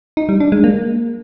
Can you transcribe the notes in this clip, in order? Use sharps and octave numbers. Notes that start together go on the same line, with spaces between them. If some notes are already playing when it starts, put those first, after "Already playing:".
D#4
G3
D4
G#3
A#3